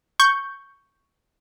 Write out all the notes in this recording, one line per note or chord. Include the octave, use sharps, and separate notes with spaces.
C#6 G6